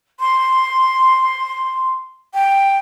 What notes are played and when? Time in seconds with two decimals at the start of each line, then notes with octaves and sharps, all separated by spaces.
0.20 C6
2.34 G5